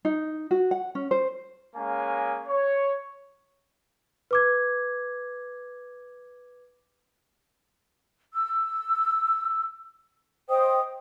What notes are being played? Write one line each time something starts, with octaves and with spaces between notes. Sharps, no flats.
D#4
F#4
F#5
C#4
C5
G#3 A#3 C#4 F5 G#5
C#5
B4 D6 G#6
E6
C5 D#5 G5 D#6